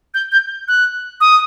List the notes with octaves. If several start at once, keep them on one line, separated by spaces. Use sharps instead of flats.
G6
G6
F#6
D#6